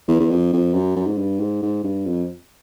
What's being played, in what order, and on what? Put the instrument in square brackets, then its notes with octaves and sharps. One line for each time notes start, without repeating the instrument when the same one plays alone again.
[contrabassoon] E2
E2
F2
F2
F#2
F#2
G#2
G2
G#2
G#2
G2
F2